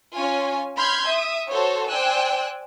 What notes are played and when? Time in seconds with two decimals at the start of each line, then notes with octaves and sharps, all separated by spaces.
0.16 C#4 F4 C#5 G#5
0.77 B5 C6 F6 G6 G#6
1.08 E5 D#6
1.50 F#4 A4 C5 C#5
1.90 C5 D5 G5 G#5 E6 F#6